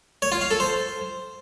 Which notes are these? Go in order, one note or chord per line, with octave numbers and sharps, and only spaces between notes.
C#5
F4
F5
A4
C5